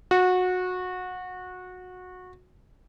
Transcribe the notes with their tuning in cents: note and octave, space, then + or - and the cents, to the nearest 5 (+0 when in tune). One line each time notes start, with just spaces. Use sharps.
F#4 -20